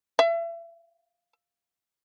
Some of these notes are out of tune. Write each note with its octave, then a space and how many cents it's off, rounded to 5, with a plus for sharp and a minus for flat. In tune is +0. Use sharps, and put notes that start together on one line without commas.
E5 +35